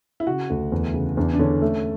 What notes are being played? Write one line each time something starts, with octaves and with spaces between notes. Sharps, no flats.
E4
C#3 F#4
D2
E2
C#3
E2 D4
D4
D3 C#4
A3